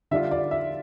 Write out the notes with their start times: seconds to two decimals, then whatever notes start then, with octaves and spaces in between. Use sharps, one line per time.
0.11 D3 G3 D4 F4 E5
0.31 D5
0.51 E5